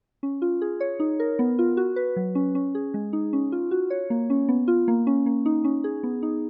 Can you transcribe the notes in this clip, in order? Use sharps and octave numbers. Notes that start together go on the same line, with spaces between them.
C#4
F4
G#4
C#5
D#4
A#4
B3
F4
F#4
B4
F#3
C#4
C#4
G#4
G#3
D#4
C#4
F4
F#4
C#5
A#3
C#4
B3
F4
A#3
C#4
A#3
D#4
C#4
G#4
B3
D#4